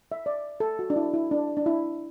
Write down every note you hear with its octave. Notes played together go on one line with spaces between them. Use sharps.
E5
D5
A4
F#4
D4
E4
E4
D4
D4
E4